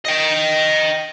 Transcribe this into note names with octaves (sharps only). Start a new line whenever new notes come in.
D#5 G5